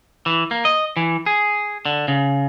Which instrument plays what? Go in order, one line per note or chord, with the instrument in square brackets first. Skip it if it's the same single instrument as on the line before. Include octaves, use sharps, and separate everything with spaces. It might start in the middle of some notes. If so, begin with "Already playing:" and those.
[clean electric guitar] E3
A#3
D#5
E3
G#4
D3
C#3